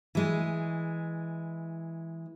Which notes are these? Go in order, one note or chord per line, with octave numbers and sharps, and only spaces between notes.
E3 G#3